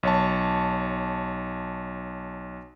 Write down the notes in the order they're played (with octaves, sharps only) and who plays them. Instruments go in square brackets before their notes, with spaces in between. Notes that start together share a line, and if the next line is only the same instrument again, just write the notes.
[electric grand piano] B1 C#5 A5